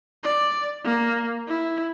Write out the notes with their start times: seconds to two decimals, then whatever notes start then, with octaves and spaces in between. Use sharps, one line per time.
0.24 D5
0.85 A#3
1.48 E4